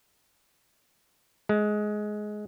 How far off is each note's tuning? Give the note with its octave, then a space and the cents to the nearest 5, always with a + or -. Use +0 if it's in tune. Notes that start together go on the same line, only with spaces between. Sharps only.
G#3 +15